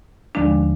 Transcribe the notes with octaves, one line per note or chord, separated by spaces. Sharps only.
D#2 D3 F3 G#3 D4